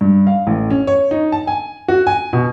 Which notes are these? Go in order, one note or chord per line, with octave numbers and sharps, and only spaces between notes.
G2
F5
A1
C#4
C#5
D#4
A5
G#5
F#4
G#5
B2